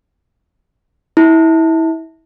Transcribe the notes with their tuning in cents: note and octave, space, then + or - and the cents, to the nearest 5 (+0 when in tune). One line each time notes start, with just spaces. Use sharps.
E4 -25